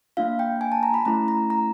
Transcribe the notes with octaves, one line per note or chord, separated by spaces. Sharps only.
A#3 D4 F4 F5
G5
G#5
A5
A#5
B5
A3 C#4 E4 A#5
A#5
A#5